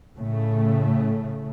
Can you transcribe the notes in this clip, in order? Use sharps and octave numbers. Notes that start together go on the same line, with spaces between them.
A2 C#3 A3